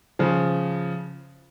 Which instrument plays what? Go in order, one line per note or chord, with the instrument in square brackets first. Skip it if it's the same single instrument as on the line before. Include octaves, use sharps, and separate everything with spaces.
[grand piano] C#3 F3